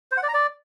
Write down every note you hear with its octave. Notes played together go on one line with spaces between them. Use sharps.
C5
F#5
D5
A#5
D5